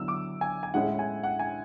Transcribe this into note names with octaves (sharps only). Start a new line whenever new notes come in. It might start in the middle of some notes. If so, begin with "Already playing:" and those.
Already playing: D3 F#3 B3 E4 E6
D6
G#5
G#5
A2 G#3 C#4 E4 F#5
G#5
F#5
G#5